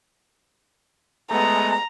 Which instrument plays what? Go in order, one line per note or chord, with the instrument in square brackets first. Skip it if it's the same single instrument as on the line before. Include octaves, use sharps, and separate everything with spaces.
[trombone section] G#3 A3 B3 [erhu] A#5